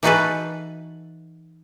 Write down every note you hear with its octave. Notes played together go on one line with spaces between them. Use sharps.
E3 D#4 F#4 G#4 A4 B4